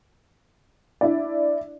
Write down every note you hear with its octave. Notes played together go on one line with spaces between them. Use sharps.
D4 E4 D5